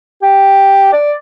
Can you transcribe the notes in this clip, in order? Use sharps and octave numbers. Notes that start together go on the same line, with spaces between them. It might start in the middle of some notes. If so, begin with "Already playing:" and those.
G4
D5